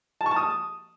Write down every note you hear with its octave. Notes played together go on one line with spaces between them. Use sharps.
A5
C#6
A5
D#6